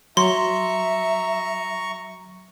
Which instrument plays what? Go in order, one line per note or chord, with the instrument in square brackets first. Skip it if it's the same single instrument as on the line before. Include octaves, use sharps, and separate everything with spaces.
[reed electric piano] F#3 [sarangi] E5 [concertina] A#5 C#6 [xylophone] C6